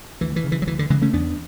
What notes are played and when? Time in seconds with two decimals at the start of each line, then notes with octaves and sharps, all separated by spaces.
0.21 D2 E3
0.36 E3
0.44 C#3
0.52 E3
0.62 F#3
0.67 D2 E3
0.79 D3
0.90 C#3 E3 G#3
1.02 A3 C#4
1.13 E2 B3 D4